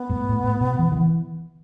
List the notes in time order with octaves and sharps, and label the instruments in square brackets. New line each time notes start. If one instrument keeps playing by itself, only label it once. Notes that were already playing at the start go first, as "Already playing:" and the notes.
Already playing: [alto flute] B3
[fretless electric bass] G#2
A2
A2
A2
B2
E3
D#3
E3